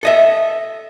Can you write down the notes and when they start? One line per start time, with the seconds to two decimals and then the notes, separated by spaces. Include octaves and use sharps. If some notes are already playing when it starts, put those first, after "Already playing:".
0.03 A4 D#5 E5